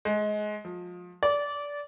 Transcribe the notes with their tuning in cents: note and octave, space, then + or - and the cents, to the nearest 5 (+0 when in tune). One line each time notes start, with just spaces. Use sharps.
G#3 +20
F3 +30
D5 -20